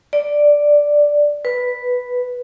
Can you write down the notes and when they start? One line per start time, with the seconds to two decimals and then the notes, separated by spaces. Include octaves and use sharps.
0.13 D5
1.45 B4